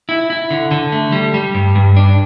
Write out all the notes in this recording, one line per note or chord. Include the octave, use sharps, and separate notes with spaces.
E4
E4
D3
D3
A3
G3
G3
G2
G2
D4